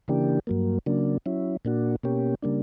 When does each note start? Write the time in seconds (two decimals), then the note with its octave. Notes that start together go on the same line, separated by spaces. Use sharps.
0.08 C#3 E3 A#3 D4 G4
0.47 G2 F#3 A#3
0.86 C#3 F#3 A#3 D4
1.26 F#3 C#4 E4
1.65 A#2 A#3 D4 F#4
2.03 B2 A#3 C#4 G4
2.43 C#3 G3 A#3 D4